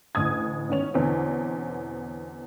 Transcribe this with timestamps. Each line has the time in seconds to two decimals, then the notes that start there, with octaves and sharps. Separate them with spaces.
0.15 A1 D2 D#6 G#6
0.69 G#2 D#3 B3 C#4 F7
0.94 E2 B2 D3 E3 C4 C#4